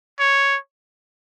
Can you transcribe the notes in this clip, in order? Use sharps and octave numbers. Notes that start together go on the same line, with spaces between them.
C#5